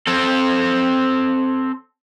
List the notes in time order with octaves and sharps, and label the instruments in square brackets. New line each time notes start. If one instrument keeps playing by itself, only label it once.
[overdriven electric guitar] C4 A4